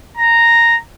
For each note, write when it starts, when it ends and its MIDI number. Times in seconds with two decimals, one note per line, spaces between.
0.18 0.75 82